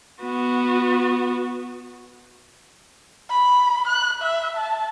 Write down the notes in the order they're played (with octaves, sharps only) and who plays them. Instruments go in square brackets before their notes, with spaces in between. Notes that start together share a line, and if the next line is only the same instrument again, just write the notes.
[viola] B3 F#4
[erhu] B5
F#6
E5
A5